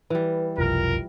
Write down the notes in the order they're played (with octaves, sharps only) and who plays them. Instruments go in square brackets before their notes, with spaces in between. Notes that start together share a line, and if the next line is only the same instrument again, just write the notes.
[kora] E3 G3 [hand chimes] B4
[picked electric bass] F1 B1 F2 [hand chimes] F4 [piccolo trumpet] A#4